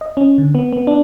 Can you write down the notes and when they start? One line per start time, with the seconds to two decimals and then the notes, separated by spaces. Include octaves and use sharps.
0.01 D#5
0.17 C#4
0.38 D3
0.55 B3
0.73 B3
0.87 D4